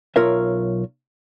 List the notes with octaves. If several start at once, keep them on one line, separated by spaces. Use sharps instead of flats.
B1 F4 A#4 C#5 E5